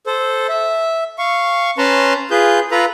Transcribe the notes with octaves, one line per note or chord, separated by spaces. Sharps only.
A4 C5
E5
F5 C#6
C#4 B4 A5 A#5 C6
F4 G#4 B4 G6
F4 A4 B4 A#5 B5